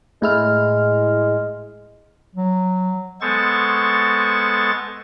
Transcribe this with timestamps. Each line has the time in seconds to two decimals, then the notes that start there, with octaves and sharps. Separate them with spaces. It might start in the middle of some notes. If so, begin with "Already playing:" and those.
0.22 A2 G#3 E4 F6
2.36 F#3
3.21 G#3 B3 A4 C5 C#6 A6